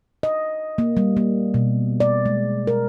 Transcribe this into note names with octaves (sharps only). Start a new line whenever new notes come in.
D#5
A#3
G3
A#3
B2
D5
G#3
A#4